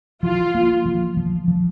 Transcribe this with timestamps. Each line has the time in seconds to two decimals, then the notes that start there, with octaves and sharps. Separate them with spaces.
0.23 F3 F4
0.55 A#3
0.86 F3
1.17 F3
1.48 F3